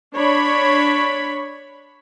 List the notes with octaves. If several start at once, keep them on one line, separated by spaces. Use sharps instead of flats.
D4 C#5 B5